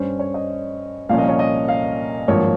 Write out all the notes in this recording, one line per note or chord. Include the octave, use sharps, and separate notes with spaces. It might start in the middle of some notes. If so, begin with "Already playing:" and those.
Already playing: G2 G3 C#4 C5
C#5
D#5
C2 A#2 F3 A#3 C#4 F5
D#5
C#5
D#5
F5
G#1 G2 F3 A#3 C#5